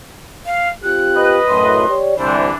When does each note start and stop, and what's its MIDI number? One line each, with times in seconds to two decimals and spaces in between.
0.46 0.69 77
0.84 1.39 60
0.84 1.39 65
0.84 1.39 67
0.84 1.35 90
1.15 1.90 71
1.15 1.90 75
1.49 1.88 42
1.49 1.88 45
1.49 1.96 84
1.88 2.15 67
1.88 2.15 73
1.88 2.15 74
2.18 2.49 36
2.18 2.54 50
2.18 2.54 52
2.18 2.54 62
2.18 2.44 72